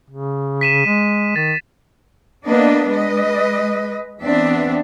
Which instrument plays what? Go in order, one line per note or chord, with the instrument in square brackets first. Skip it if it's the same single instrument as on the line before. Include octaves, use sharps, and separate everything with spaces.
[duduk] C#3
[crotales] B6 D#7 E7
[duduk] G#3
[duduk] D#3 [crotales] A6
[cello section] A#3 B3 D4 B4 D#5
G#3 B4 D#5
E2 B3 C4 D4 E5